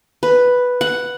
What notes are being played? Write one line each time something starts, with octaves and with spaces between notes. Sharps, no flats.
B4
F#5